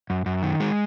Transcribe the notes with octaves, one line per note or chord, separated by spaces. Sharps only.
F#2
F#2
D#3
G#3